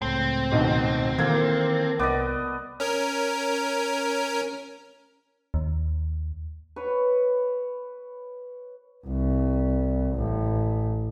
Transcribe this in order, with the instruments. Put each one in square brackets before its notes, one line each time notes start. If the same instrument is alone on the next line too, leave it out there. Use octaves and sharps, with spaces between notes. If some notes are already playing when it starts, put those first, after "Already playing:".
[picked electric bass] C#2 A2 [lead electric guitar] C4
[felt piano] B1 B2 D#3
[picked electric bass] D#3 E3 [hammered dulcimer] A#3 A4 [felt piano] G#6
[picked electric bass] C2 [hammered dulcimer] B3 D5 D#5 [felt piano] D6
[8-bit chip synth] C#4 A#4
[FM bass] D#2
[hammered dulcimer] B4 C#5
[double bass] C2
A1